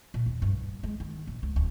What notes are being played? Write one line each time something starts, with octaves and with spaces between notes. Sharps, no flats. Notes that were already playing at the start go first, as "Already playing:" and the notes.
A#2
E2
G2
G2
G#3
D#3
A#1
C#2
D1